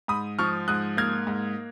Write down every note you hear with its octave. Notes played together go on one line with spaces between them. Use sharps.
G#2 B5 D#6
F3 C#6 F6
G#2 D#6 F#6
A#3 F6 G#6
G#2